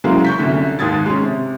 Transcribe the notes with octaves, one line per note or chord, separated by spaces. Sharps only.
C#3 E3 F#3 G#3 A#3
C#6 G6 B6
C2 F#2 D3
D#2 G#2 D#6 G#6 A6
G#3 C#4
C3